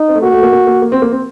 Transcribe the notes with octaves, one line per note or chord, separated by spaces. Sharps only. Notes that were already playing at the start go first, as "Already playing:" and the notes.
Already playing: D#4
C4
A3
A#3 F#4
A3
A#3
A#3
A#3
A#3
C4
A#3
C4